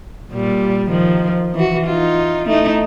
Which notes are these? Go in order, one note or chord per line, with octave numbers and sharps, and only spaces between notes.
A#2 G3
D#3 F3
E3 F#4
D#4 F4
A3 D#4 E4